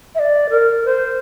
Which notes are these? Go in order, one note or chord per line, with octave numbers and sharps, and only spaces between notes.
E5
D5
A#4
C5